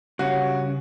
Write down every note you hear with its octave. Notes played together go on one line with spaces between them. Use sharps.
G2 C#3 C#4 F#4